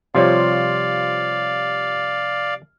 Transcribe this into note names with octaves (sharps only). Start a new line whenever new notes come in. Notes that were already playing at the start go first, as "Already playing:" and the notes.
C3 F3 G3 F4 C#5 D5 F5